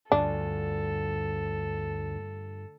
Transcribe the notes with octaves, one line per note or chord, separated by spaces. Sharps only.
D2 G2 D4 F4 A4 G#5